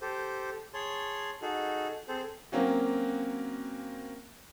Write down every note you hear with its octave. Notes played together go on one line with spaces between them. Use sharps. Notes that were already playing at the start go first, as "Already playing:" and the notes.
G4 A4 C5
G#4 C#5 A5 C6
D#4 F#4 G#4 A4
C4 G#4 A4 C5
F#3 A#3 C4 C#4 F#4